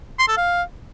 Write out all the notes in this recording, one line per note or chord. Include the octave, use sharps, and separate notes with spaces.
C6
A4
F5